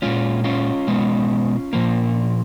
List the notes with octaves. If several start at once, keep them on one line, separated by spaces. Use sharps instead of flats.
A#2 G#3 C#4 F4
C#4 F4
B2 G#3 B3
A#2 F3 A#3